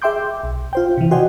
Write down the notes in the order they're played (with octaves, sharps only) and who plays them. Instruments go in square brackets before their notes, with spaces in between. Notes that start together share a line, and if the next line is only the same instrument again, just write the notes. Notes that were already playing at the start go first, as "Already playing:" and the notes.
[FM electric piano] G#4 E5 G5 C6 D6 G6
B1
F4 C5 G5
C3 E3
F#4 C5 D5 D#5 G5 G#5